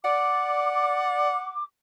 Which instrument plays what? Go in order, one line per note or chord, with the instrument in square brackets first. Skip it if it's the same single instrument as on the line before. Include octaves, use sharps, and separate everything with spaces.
[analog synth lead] D5 [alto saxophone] F#5 [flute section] D6